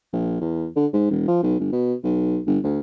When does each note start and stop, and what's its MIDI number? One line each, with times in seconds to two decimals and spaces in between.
0.13 0.36 34
0.40 0.67 40
0.76 0.86 50
0.93 1.10 44
1.11 1.26 28
1.28 1.38 53
1.42 1.57 35
1.60 1.69 31
1.72 1.94 47
2.03 2.39 35
2.46 2.59 31
2.64 2.80 38